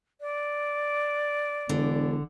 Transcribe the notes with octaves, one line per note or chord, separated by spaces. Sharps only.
D5
E1 D3